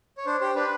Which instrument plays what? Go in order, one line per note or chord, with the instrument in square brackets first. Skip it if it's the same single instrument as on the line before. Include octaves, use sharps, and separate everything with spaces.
[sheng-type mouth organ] C#5
D4 C5
G4 C5
D4 B4